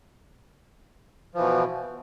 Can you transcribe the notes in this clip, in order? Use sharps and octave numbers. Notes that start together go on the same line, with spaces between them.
B2 E3 F3